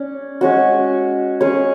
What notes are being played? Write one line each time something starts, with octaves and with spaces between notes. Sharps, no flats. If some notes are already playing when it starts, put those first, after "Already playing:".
Already playing: C#4 D5
G#3 C#4 F#4
C#4 G#4 C#5